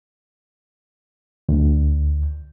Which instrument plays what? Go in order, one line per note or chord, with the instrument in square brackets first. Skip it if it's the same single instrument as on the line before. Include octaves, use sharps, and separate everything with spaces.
[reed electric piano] D2